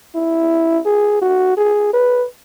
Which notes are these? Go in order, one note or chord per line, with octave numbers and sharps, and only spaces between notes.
E4
G#4
F#4
G#4
B4